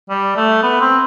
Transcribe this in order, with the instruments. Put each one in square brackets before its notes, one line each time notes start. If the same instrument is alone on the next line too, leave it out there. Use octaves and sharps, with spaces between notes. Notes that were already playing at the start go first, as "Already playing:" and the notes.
[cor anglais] G3
A3
B3
C4